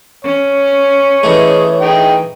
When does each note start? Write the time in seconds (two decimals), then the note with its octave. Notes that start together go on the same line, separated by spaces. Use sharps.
0.24 C#4 C#5
1.23 E3 A3 G#4 D#5
1.81 D#4 G#4 G5